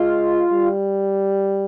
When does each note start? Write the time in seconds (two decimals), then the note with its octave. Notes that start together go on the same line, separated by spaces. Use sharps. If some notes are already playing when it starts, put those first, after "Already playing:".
Already playing: G#3 F4
0.53 G3